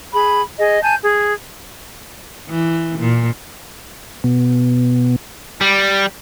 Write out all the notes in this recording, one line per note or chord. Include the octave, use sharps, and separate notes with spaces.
G#4 B5
G#4 D#5
G#5 A5 G6
G#4
E3
A#2
B2
G3